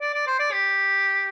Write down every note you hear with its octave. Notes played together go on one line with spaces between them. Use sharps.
D5
D5
C5
D5
G4